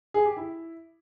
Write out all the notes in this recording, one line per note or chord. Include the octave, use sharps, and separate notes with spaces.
G#4
G4
E4